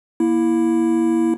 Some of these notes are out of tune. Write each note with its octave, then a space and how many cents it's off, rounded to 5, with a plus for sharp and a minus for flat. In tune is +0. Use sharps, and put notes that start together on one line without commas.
A#3 +25 E4 +0